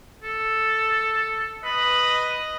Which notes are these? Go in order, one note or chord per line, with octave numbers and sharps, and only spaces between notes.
A4
B4 D#5